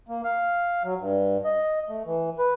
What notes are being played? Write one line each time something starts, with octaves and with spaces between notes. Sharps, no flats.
A#3
F5
F#3
G2
D#5
A3
E3
B4